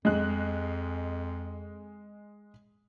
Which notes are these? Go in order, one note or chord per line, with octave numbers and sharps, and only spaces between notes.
F2 G#3 F#6